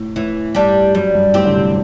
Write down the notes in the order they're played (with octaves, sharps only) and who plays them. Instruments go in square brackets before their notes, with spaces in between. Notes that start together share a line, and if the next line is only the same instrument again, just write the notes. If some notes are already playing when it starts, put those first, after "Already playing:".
Already playing: [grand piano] A2
[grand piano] A2 [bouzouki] E3
[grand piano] G2 [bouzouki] G3 D4 G4
[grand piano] F#2 [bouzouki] G3
[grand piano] G2
[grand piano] A2 [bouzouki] C4 G4
[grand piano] D3
C3